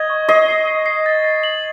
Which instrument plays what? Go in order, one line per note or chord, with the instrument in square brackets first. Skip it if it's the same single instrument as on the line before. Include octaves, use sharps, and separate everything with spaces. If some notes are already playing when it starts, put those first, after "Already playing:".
Already playing: [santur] D#5 [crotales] G#6
[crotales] C#6
[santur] D#5 [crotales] C7
[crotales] C7
C7
C7
A6
A6
F#7